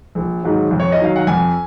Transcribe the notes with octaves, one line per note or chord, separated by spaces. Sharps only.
A#1
G#2 D#3 F#3
F2
C#5
D#5
D#3 F#3 F5
F#5
F2 G#5